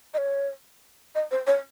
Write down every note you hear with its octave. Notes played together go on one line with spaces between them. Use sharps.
D#5
C#5
D#5
C5
C#5